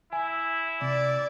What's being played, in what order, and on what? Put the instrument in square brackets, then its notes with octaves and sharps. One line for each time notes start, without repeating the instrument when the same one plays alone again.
[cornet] E4 [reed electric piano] G#5
[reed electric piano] C3 [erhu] D5